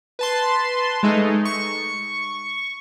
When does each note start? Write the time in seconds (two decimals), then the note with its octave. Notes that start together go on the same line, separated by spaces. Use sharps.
0.19 B4 A5 C6
1.03 G#3 A3 D#4
1.45 C#6